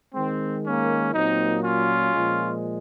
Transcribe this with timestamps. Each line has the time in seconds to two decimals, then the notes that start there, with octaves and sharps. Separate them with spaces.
0.14 D#3 G#3 C4
0.64 A#3 C#4
1.13 A#2 F#3 A#3 C4 D#4
1.63 C#4 F4
2.13 A#2 F3 G#3